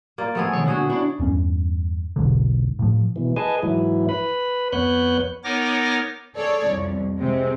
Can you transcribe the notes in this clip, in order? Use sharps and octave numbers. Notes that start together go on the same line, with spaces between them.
A#3 F4 D5
F3 A3 B3 G#4
C3 D#3 C#5
A#2 D3 F#4 G#4 F#5
D4 E4 C#5
E2 G2 C#4
E1 B1 G#2 D3
A2 F3
B2 E3
G#4 B4 D#5 G#5 A5
G#2 E3 F#3 E4
B4 B5
F2 B3 B4 C#5 F#6 G6
B3 D#4 A#4 C#5 D6 A#6
G#4 A4 C#5 D5
C2 F2
C3 G#3 C4